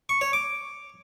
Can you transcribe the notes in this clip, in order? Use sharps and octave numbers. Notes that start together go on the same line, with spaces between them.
C#6
C#5
D6